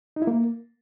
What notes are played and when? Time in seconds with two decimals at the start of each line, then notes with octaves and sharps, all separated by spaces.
0.16 D#4
0.22 E4
0.27 A#3